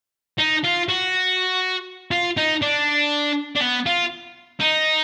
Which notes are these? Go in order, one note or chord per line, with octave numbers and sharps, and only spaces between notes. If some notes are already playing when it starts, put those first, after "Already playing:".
D#4
F4
F#4
F4
D#4
D4
D4
B3
F4
D#4